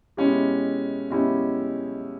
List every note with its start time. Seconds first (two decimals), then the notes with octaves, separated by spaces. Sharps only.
0.17 B2 G#3 C#4 E4 G4
1.10 B2 G#3 C#4 E4 G4